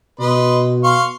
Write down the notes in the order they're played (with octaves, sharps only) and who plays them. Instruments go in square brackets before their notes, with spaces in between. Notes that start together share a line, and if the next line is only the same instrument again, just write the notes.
[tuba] B2 [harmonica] B4 D#5 C6
[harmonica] F5 C6 C#6